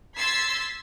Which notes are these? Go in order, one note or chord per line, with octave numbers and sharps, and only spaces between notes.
C6 E6 G#6 A6 B6 C7